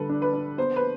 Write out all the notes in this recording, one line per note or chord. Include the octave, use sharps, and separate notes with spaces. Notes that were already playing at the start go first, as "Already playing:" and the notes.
Already playing: D3 G3 A4 B4
D4
B4
D4
B3 C5
B4